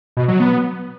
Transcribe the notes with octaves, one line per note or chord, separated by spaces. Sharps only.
B2
F#3
B3